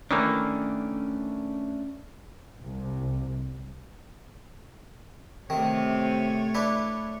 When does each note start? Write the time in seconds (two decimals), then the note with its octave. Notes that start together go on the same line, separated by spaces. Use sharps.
0.11 D#3 E3 A3 A#3 C#4 D4
2.61 C2 C3
5.50 C3 D#3 A3 C#5
6.55 D4 E4 B4